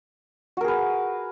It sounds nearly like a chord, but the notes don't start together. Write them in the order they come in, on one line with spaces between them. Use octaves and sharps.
F#4 A#4 G#4 B4